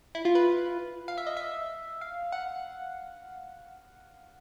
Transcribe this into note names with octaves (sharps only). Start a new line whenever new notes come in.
E4
F4
B4
F5
E5
D#5
E5
F5
F#5